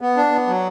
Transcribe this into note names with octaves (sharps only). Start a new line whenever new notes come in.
B3
D4
B3
F#3